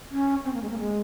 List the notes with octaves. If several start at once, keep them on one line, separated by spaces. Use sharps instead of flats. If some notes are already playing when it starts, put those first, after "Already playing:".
C#4
C4
A#3
G#3
A#3
G#3